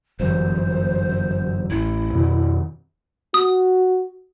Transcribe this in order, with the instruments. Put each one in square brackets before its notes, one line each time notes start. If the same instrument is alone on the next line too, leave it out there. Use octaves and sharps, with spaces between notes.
[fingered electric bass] G1 F#2 E3 [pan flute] C5
[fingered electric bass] A1 [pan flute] E4
[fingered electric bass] F2 B2 D#3
[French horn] F#4 [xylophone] D#6